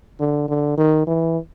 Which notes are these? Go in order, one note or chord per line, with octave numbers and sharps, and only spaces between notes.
D3
D3
D#3
E3